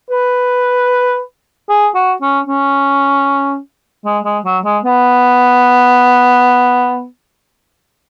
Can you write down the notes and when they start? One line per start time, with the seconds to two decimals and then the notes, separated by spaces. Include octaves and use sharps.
0.10 B4
1.69 G#4
1.95 F#4
2.22 C#4
2.47 C#4
4.05 G#3
4.25 G#3
4.45 F#3
4.64 G#3
4.85 B3